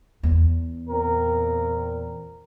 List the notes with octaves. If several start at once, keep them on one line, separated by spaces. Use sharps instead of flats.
E2
A#2 C4 A#4